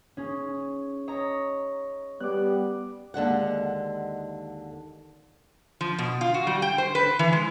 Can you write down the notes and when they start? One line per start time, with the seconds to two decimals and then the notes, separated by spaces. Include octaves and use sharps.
0.17 C#4 G#4
1.08 C#5 D#5 A#5
2.20 G3 B3 D6 F#6
3.14 D#2 D3 G#3 F#5
5.81 F3
5.99 B2
6.21 F4
6.34 F#4
6.47 G3
6.62 G5
6.78 C5
6.95 B4
7.19 E3
7.33 G#3